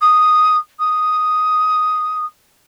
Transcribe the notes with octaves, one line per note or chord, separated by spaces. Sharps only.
D#6
D#6